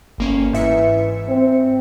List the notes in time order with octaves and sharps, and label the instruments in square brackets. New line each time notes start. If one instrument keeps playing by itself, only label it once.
[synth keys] G1 A#3 C#4
[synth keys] G#2 E5 C#7 [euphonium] E3
[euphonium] C4